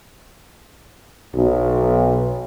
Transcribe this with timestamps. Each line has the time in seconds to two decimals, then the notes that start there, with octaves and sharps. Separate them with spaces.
1.34 B1